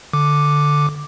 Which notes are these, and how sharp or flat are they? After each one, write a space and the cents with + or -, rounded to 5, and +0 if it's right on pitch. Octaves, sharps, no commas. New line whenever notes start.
D3 +0 D6 +0